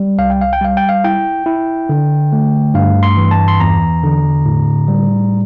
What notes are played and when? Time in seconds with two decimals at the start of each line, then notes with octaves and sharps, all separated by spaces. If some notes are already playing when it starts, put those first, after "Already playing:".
Already playing: G3
0.18 C2 F5
0.30 G5
0.41 F5
0.53 G5
0.61 G3 F5
0.77 G5
0.89 F5
1.04 E4 G5
1.46 E4
1.89 D3
2.33 A3
2.74 G2 F5
3.03 C6
3.17 E3
3.31 A5
3.48 C6
3.60 E2 A#5
4.03 D3
4.45 A2
4.88 G3